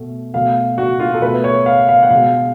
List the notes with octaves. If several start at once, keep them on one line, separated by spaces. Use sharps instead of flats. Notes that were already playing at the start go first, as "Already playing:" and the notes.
Already playing: B2 A3
B2 A3 F5
F#4
F4
A4
B2 A3 B4
C#5
F5
F5
F#5
B2 G#3 F5